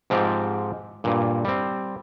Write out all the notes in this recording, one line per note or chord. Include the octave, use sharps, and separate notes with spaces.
G#2 F3 C4 G4
G2 A#2
G3 C4